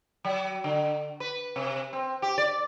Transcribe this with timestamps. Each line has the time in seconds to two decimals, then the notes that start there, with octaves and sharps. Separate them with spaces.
0.25 F#3
0.64 D3
1.20 B4
1.56 C3
1.93 C4
2.22 G4
2.38 D5